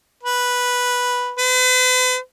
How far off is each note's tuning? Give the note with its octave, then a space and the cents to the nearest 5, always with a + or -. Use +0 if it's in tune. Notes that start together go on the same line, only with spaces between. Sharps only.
B4 -5
B4 +45